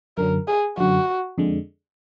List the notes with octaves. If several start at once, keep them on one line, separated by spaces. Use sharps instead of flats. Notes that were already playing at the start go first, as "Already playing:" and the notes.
F#2 D3 F#3 A#4
G#4
F#2 D3 F#3 F#4
F2 D3 G#3